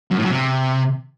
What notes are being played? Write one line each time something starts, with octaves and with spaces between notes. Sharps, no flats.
F#2
A2
F#2
C3